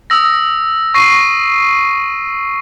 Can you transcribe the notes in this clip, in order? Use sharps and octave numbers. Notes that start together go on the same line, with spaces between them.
D#6 E6 A#6
C#6 A#6 C7 D#7